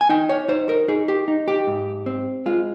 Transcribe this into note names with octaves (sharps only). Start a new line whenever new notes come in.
G#5
D#4 G5
C#5
D#4 C5
A#4
D#4 G#4
G4
D#4
G4
G#2
C4
G#3 F4